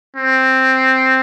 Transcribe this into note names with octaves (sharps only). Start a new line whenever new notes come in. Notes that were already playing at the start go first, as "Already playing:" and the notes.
C4